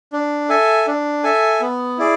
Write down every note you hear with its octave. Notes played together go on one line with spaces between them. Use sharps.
D4
A4 E5 G#5
D4
A4 E5 G#5
B3
E4 G#4 D5